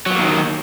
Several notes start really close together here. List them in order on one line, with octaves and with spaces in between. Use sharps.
F#3 B3 A#3 D#3